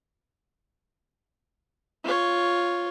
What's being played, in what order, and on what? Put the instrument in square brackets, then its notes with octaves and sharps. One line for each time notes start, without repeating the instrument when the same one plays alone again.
[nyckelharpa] F4 C#5